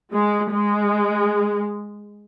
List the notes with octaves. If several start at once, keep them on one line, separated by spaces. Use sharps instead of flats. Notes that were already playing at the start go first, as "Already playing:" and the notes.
G#3
G#3